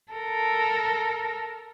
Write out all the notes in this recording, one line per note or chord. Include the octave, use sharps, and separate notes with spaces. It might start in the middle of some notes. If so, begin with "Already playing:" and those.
A4 A#4